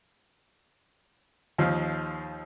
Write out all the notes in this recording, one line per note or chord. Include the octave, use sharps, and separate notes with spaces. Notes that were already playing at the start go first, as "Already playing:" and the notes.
D#2 F3 D#4